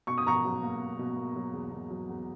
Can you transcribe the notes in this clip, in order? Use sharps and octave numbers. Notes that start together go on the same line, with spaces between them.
B2 C#6
D#6
B2 A#5 C#6
F#3
A#3
A#3
B2
A#3
F#3
E2
B2
F#3
E2